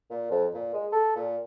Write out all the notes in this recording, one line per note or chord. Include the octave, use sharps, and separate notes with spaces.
A#2
F2
A#2
G#3
A4
A#2